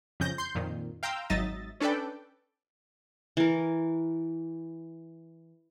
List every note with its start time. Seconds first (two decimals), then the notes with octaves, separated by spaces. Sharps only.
0.20 F2 C#3 G6 A#6
0.38 C6 G6
0.55 F2 A#2 D#3
1.03 F5 G5 A#5 C6 E6
1.30 G#1 F#3 D#4 D#5 E5 A6
1.80 C#4 D4 A4 B4 D5 G5
3.37 E3 A#4